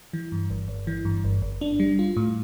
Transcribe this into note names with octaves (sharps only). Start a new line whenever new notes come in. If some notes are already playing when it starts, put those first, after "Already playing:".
E3
G2
G1
G1
E3
G2
G1
G1
D4
G3
F4
A2